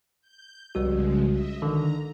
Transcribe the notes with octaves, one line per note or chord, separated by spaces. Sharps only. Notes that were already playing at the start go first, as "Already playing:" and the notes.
G6
C2 C#3 F3 G3 G#3 F#4
D#5 E5
D3 D#3 A#5